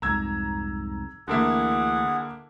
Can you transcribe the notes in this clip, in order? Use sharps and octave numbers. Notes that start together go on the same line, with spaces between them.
C2 F2 G#2 A#5 E6 G#6
D2 D3 E3 A#3 E4 G#4 F#5